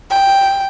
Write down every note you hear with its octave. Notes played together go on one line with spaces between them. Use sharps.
G5